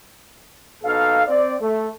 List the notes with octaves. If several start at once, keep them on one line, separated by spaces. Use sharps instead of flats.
B2 D#4 A4 F5
C4 D5
A3